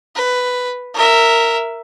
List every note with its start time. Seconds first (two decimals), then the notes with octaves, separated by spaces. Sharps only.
0.16 B4
0.95 A#4 E5